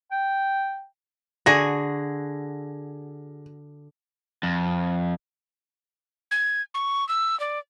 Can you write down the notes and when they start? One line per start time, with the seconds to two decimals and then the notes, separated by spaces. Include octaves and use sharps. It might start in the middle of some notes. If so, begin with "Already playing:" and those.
0.11 G5
1.46 D3 F#4 G#4 A#6
4.43 F2
6.31 G#6
6.74 C#6
7.09 E6
7.40 D5